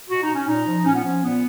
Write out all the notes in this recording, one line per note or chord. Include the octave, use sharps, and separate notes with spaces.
B2 F#4
D#4
C#4
A#2 D#4
F3
A#2 C#4
B3
F3 C#4
A#2 B3